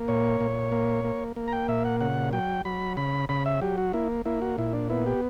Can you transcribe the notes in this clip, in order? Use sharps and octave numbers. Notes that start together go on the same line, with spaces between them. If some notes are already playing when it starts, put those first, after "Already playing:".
Already playing: A#3
A#2 C#5
A#2
A#3
A#3
A#3
A#5
G5
A#2 E5
F#5
C#3 F#5
F#3 G5
F#3 B5
C#3 B5
C#3 B5
E5
F#3 G4
F#4
A#3 E4
A#3 E4
F#4
A#2 E4
D4
B3 E4
G4